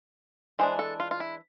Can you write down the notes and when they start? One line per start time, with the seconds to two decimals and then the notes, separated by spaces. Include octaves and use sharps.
0.59 E3 G#3 D4 C5
0.79 A4
1.00 F4
1.11 F4
1.20 E4